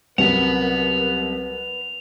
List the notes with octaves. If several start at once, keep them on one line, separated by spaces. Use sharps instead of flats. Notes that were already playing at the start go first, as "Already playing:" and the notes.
C2 F#3 C#4 A#4 B4 F#5 F7